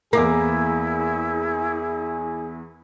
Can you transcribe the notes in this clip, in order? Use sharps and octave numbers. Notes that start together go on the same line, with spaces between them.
E2 A#3 E4 G#4 D6 A#6